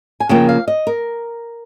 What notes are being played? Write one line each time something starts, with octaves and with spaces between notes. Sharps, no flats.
G#5
C#3 F3 A#3 F4 G5
F5
D#5
A#4